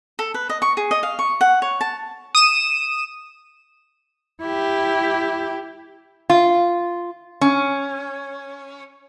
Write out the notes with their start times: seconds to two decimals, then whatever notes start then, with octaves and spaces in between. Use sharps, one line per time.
0.19 A4
0.34 B4
0.50 D#5
0.62 C#6
0.77 G#4
0.91 D#5
1.03 F5
1.19 C#6
1.41 F#5
1.62 C#5
1.81 A5
2.35 D#6 D#7 E7
4.41 E4 G4
6.30 F4
7.41 C#4